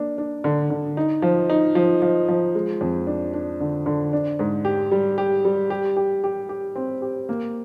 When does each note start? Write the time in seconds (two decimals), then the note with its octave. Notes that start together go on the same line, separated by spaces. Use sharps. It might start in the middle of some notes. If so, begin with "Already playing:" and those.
Already playing: A#3 D4
0.18 D4
0.44 D3
0.70 D3
0.97 D#4
1.22 F3
1.50 D#4
1.75 F3
2.02 F3
2.28 F3
2.55 G#3
2.81 F2
3.07 D4
3.34 D4
3.60 D3
3.86 D3
4.13 D4
4.39 G#2
4.65 G4
4.91 G3
5.18 G4
5.45 G3
5.70 G4
5.97 G4
6.24 G4
6.49 G4
6.76 C4
7.02 G4
7.29 A#3